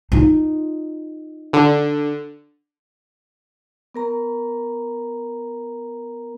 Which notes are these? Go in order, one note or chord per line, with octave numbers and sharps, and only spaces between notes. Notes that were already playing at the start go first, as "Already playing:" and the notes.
D#4 F4
D3
B3 A#4 A#5